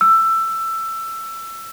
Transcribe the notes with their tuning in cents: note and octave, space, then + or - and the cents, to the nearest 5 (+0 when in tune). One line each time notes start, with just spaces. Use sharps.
E6 +15